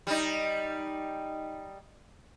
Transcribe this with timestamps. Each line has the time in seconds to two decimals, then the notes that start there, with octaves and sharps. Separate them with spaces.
0.07 G3 D#4